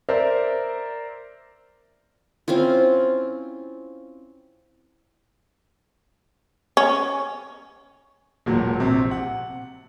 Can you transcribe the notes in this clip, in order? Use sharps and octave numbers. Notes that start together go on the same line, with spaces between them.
A#4 C5 D5 E5 A#5
C4 C#4 E4 F4
C#4
E1 A#2 F#3
A#1 C3
F#5